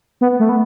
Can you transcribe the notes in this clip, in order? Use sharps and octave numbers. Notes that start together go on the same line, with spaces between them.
B3
A3
B3